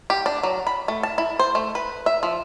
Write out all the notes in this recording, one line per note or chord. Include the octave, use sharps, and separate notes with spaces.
G4
D4
F#3
B5
A3
A5
E4
C5
A3
B4
E5
F3